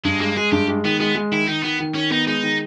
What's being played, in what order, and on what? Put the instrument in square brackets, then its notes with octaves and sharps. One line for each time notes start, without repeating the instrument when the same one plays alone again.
[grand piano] G2 [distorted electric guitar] G#3
[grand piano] G#3 [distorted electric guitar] A#3
[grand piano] G#3 [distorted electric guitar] G#4
[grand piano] G2 [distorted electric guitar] G4
[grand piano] G#3
[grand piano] D#3 [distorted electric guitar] B3
[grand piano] G#3 [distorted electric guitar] B3
[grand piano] G#3
[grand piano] D#3 [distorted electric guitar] E4
[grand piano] D#3 [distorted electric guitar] D#4
[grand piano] D#3 [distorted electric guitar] B3
[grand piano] D#3
[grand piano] D#3 [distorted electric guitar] C#4
[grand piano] B3 [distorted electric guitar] D#4
[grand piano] G#3 [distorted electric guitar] D#4
[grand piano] D#3